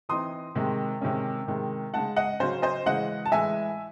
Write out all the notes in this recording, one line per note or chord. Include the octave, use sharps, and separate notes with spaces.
E3 C4 D#4 C6 D#6
C3 D#3 G#3
C3 D#3 G#3 C#4
C3 D#3 G#3
C#3 G#3 D#4 F#5 A5
D#5 F#5
C#3 F#3 C#4 C5
C5 D#5
C#3 E3 G#3 D#5 F#5
A5
A2 E3 G#3 E5 G#5